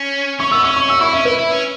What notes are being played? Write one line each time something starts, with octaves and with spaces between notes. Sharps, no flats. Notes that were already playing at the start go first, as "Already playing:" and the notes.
Already playing: C#4
C#4 C#6
B3 E6
C#4 C#6
C#6
F#4 E6
E4 C#6
C#4 E5
E4 B4
E4
C#4